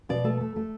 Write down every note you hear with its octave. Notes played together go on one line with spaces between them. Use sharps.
B2 D5
A3 A4
A3
A3